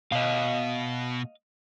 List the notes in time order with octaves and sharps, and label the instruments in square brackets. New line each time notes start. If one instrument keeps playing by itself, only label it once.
[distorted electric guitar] B2 [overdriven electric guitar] D#5 F5